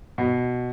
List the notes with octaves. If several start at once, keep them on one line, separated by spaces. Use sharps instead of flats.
B2